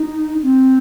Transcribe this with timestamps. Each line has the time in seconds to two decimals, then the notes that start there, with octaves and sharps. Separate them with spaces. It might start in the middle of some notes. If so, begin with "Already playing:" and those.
Already playing: D#4
0.43 C4